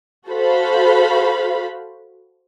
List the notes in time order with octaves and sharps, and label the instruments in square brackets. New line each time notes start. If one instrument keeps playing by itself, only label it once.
[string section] F#4 A4 C5 F5 B5